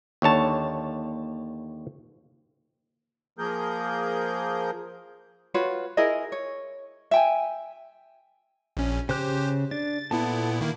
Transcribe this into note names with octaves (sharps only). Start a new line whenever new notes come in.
D#2 D3 C#5 A5
F3 A#3 G#4 A#4 G6
F4 F#4 B4 C#5
E4 G#4 A#4 D#5
C#5
E5 G5 G#5
A#1 C#4
C#3 G4 C5 F#6 G6
D4 A6
A#2 B3 E4 A4 A5
D#3 A#3 E4